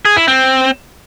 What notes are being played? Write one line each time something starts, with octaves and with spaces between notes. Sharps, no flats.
G#4
E4
C4